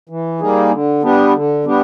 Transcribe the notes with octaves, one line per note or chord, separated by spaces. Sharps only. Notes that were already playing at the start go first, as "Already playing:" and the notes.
E3
G3 A#3 D#4 G#4
D3
G3 B3 D4 G4
D3
G3 B3 D4 G4